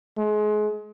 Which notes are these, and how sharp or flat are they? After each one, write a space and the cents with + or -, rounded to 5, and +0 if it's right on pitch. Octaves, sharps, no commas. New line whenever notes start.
G#3 +30